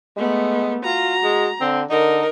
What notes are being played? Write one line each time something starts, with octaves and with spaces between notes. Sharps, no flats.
G#3 A3 B3
F4 F#4 A#5
G#3
D3 C4
D3 D#4 A#4